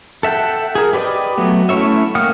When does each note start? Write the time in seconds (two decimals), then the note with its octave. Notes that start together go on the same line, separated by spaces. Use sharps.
0.23 A4 E5 F#5 G5
0.75 G#4 A#4
0.93 G4 B4 D5 D#5
1.38 F#3 A3 B3
1.69 A3 C#4 E4 C#5 E5
2.15 A#3 F#5 G5 D#6 F6